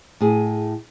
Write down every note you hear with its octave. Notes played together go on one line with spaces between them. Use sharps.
A2 G#4